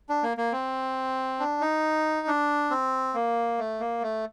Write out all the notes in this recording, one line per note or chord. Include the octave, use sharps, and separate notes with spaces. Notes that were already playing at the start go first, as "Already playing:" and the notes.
D4
A#3
A#3
C4
D4
D#4
D4
C4
A#3
A3
A#3
A3